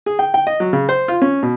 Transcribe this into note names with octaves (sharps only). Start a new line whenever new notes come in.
G#4
G5
G5
D#5
F#3
C#3
C5
F4
C#4
B2